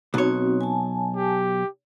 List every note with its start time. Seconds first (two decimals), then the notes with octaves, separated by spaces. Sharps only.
0.14 B1 C4 D#4 F#4 C#5
0.61 G#5 A5
1.16 G4